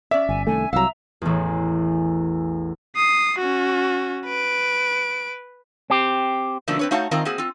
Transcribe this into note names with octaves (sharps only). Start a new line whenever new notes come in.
C#4 D5 E5
G1 G#5
C2 D#3 A3 G#5
C2 F#3 F5 A#5 E6
A1 E2
D#6 C7
C#4 F#4
B4 D7
C4 G4
B2 D3 F3 A3 A#3 D4
C4 B4 C#5
A3 D#4 F#4 C#5 F5 A5
D#3 C4 F4 A#4 D#5 A#5
A#3 C4 F#4 G#4
C4 F4